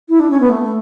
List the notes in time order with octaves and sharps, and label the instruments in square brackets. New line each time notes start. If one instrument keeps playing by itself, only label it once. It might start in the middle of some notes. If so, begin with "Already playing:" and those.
[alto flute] E4
D4
C#4
B3
A3